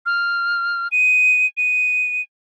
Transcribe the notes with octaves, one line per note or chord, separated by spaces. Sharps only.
F6
D#7
D#7